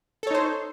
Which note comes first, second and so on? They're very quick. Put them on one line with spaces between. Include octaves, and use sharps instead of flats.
A4 C#5 D#4 C5